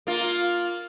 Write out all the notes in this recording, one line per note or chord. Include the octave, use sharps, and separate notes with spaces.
A#3 F4